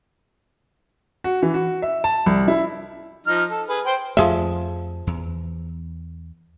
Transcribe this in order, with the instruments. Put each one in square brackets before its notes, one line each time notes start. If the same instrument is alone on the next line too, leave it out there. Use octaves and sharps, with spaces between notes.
[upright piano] F#4
E3
F#4
E5
A5
C2
E4
[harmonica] F3 D#4 F6
A4
G#4 B4
C5 G5
[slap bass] F2 A3 [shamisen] F3 G#4 E5
[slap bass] E2